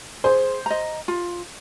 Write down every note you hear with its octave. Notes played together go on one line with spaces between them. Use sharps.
G#4 C5
D#5 A#5
F4